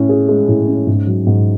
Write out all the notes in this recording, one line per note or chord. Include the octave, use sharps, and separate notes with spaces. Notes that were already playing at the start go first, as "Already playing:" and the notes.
Already playing: A2 C#4
G#4
G#3
A2
C#4
G#2
F#3
G#2